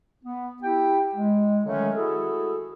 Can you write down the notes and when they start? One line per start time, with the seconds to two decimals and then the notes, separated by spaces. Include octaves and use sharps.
0.24 B3
0.63 E4 G4 G5
1.14 G#3
1.65 D3 D#3 F#3 G#3 A3 C#4
1.95 E4 F#4 G#4 A4